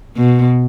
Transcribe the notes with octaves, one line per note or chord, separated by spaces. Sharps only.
B2